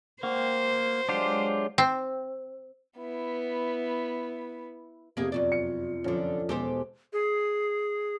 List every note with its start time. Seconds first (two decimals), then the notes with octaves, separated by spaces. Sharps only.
0.23 A#3 F#4 C5 G5
1.09 F#3 G#3 D4 F4 G4
1.78 C4
2.98 B3 E4
5.17 F2 C3 A#3 B3 G4 G#4
5.32 F#2 F#3 F4 D5
5.52 C#7
6.04 F#2 D3 F3 C#4
6.49 E2 B2 G#3 G4 A4 C5
7.13 G#4